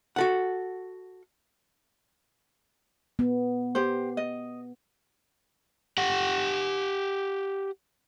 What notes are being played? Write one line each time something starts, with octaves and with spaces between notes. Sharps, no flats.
F#4 A4 F#5
B3
G4 C5
D#5
G4 F#5